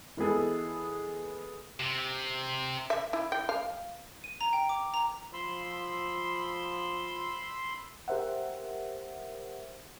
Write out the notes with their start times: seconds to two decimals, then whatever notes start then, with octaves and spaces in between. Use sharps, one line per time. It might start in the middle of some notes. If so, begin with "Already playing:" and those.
0.17 E3 G#3 B3 G#4 A4
1.80 C3
2.90 E5
3.13 E4
3.32 G5
3.49 F5
4.24 D#7
4.41 A#5
4.53 G5
4.69 D6
4.94 A#5
5.33 F3 B5 C6 E6
8.08 G4 A#4 C5 E5 F#5